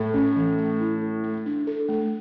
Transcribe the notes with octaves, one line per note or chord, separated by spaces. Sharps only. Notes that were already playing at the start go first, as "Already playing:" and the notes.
Already playing: A2 A4
C#4
E3
A3
E4
A4
A3
D4
A4
A3